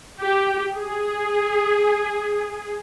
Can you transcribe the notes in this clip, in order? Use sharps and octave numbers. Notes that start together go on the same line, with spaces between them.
G4
G#4